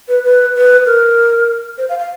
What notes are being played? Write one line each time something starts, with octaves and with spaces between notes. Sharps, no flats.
B4
B4
B4
A#4
C5
F5
F5